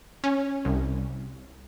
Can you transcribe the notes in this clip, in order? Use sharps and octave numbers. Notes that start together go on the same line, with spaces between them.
C#4
C2